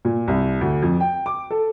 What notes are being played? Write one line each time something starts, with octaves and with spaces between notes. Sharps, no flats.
A#2
C2
D2
F2
G5
D6
A4